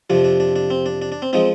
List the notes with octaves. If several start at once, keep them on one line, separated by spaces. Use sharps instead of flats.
F2 C3 F3 D4
D4
D4
D4
C4
D4
D4
D4
C4
F3 G#3 C4 D#4